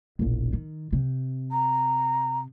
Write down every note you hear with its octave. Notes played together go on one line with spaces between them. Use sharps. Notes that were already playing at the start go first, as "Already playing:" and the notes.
E1 A#1
D#3
C3
A#5